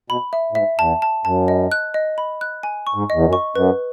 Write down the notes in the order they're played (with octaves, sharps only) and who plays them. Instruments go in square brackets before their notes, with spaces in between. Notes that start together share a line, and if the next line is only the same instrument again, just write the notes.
[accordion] B2 [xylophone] B5
[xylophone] E5
[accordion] A2
[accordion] G#2 [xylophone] E5
[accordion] E2 [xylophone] A5
[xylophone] A5
[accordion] F#2 [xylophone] A5
[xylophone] D#5
F#6
D#5
B5
F#6
G#5
C#6
[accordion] G#2
[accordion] E2 [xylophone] D#5
[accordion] F#2
[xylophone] C#6
[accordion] F#2 [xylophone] B4